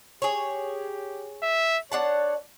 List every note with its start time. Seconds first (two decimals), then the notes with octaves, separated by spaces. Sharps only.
0.22 G4 G#4 C#5
1.42 E5
1.92 D4 C#5 F#5 A5